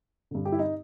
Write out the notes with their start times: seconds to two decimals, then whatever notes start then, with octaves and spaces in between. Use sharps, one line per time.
0.31 G2 D3
0.45 G4
0.52 E4
0.59 D#4